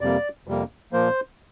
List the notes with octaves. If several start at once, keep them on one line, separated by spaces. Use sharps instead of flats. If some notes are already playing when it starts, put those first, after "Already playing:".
F2 C3 G3 A#3 D5
F2 C3 G3 A#3
A#2 F3 A#3 C5